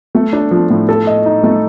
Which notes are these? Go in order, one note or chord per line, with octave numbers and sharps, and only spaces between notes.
A3
D4
F3
A2
A4
D#5
D#4
A3